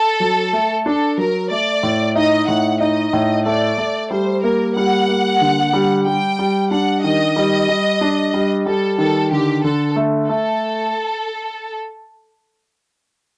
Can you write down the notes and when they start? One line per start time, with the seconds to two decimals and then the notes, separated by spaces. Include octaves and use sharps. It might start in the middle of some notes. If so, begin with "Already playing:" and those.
Already playing: A4
0.20 F#3
0.53 A3
0.86 D4 A4
1.18 F#3 A#4
1.50 A3 D5
1.83 A2
2.15 D#4 D#5
2.48 A2 F#5
2.81 D#4 D#5
3.13 A2
3.46 A3 D5
3.78 A3
4.11 G3 C5
4.43 A#3 A#4
4.75 G3 F#5
5.08 A#3
5.41 D3
5.73 G3
6.06 G3 G5
6.39 G3
6.71 D4 F#5
7.03 D#3 D#5
7.36 G3
7.68 G3
8.01 D4
8.34 G3
8.66 G3 A4
8.98 D#3 A4
9.31 D3 G4
9.63 D3 A4
9.96 A3
10.29 A3 A4